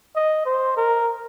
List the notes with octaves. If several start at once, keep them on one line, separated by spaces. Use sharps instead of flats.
D#5
C5
A#4